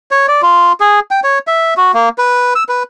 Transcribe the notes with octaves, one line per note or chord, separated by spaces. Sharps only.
C#5
D5
F4
G#4
G5
C#5
E5
F#4
A#3
B4
E6
B4